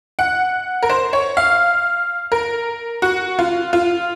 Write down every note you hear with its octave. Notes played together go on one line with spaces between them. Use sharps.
F#5
A#4
C5
C#5
F5
A#4
F#4
F4
F4